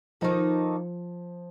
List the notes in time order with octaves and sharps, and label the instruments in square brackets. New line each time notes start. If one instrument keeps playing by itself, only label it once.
[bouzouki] D#3 A#3 D#4 A4 [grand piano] F3